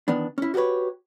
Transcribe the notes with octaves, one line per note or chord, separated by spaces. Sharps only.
D#3 E3 B3 D4
C#4 E4
F#4 G4 A4 B4 C#5